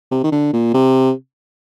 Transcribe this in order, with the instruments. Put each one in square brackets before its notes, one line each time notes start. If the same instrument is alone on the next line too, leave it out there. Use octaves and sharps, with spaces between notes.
[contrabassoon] C3
D#3
D3
A#2
C3